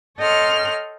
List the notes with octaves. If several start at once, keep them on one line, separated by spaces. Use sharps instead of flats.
A4 C#5 D#5 G5 C6 F6